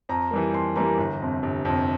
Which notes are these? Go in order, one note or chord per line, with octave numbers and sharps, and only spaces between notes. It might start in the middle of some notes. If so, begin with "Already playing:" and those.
F2 A#5
E3 G3 A#3
F2 C6
E3 G3 A#3 A#5
G1
F2 C3
G1
F2
C3